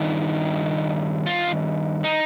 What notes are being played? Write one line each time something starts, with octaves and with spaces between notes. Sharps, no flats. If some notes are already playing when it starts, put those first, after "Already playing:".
Already playing: G2 D#3
F4
D#4